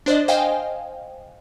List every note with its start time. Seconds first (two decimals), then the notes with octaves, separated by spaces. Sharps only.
0.06 D4 C5 D5 D#5
0.28 C5 D#5 F5 G5 G#5